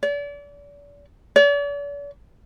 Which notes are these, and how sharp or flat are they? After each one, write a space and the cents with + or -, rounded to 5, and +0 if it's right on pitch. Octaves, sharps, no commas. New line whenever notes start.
D5 -35
D5 -45